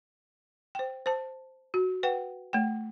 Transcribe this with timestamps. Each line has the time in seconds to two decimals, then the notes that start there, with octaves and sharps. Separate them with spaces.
0.75 C5 G5
1.06 C5 A5
1.74 F#4
2.03 B4 F#5 G5
2.53 A3 G5